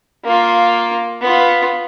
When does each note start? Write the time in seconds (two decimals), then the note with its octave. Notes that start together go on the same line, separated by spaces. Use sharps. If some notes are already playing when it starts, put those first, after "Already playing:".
0.25 A#3 F4
1.21 B3 F4